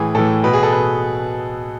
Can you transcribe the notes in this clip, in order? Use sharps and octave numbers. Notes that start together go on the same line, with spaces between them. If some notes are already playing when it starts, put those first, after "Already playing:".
Already playing: A2 E3 G#4
A2 E3 A4
B2 B4
G#4
A4
B2 B4